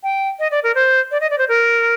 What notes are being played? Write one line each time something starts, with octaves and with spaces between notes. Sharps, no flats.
G5
D#5
D5
A#4
C5
D5
D#5
D5
C5
A#4